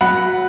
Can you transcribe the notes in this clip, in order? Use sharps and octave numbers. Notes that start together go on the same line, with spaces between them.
F#3 F#5 B5